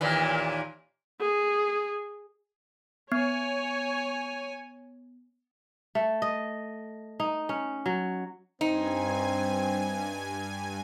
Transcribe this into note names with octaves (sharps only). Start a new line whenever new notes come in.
D#2 A#2 E3
G#4
B3 C#5 G#5
A3
D#5
D#4
C#4
F#3
G2 C4 D#4 G#5